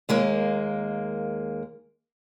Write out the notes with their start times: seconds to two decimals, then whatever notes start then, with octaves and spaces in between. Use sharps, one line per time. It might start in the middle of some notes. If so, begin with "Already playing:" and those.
0.09 D#2 G#3 A#3